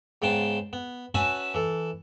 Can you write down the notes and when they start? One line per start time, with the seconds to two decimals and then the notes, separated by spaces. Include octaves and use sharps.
0.22 G#2 C#3 B3 G5 A5 C6
0.73 B3
1.14 C#4 F#4 B4 E5 G#5 A5
1.54 E3 A4